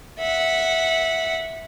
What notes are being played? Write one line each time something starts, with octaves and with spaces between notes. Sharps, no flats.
E5 F#5